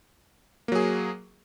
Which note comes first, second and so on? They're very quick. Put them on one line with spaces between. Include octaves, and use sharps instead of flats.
A#3 F#3 G#4